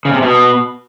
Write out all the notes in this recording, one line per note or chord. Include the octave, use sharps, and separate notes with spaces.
C#3
C3
B2